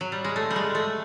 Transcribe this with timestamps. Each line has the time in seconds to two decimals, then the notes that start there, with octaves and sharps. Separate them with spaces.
0.01 F#3
0.12 G3
0.24 G#3
0.36 A3
0.51 G3
0.56 G#3
0.75 A3